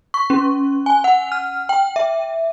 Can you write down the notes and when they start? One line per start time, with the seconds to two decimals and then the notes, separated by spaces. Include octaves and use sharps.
0.14 C#6
0.30 C#4
0.86 G#5
1.04 F#5
1.32 F6
1.69 G5
1.96 E5